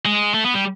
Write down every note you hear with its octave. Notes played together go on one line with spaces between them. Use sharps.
G#3
A3
B3
G3